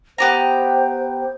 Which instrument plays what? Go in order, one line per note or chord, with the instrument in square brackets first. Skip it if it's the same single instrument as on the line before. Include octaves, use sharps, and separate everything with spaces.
[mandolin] B3 G4 A#5 [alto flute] C5